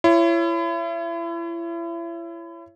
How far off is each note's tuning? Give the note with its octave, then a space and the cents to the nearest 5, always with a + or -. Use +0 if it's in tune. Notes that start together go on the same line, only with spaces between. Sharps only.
E4 +35 C#5 +0